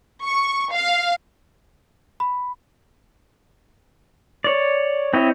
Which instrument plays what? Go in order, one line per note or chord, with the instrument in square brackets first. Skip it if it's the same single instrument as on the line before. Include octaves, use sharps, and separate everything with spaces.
[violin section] C#6
F5
[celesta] B5
[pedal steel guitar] C#5 D5
C4 E4 C#5 D#5